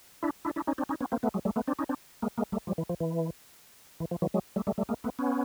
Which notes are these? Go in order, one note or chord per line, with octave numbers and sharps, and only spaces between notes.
D4 E4
D4 E4
D4 E4
C#4 D#4
C4 D4
C#4 D#4
B3 C#4
A#3 C4
A3 B3
F#3 G#3
G3 A3
A3 B3
C4 D4
C#4 D#4
C4 D4
G#3 A#3
G#3 A#3
G3 A3
F3 G3
E3
F3
E3
E3
F3
E3 F#3
F#3 G#3
G3 A3
G3 A3
G3 A3
G#3 A#3
A3 B3
B3 C#4